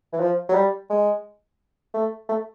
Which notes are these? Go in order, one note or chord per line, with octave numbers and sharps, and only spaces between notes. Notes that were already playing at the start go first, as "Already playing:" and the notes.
E3
F3
F#3
G3
G#3
A3
A3